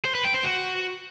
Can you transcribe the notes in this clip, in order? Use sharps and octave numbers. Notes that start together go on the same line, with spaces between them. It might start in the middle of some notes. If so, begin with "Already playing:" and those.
C5
B4
G5
C5
F#4